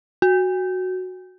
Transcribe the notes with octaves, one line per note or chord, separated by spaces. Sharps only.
F#4